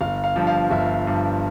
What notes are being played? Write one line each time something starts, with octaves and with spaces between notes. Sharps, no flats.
G1 F5
F5
G2 F3
F5
G1 E5
G2 F3